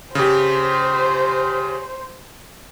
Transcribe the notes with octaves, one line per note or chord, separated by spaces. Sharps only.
C#3 G4 C5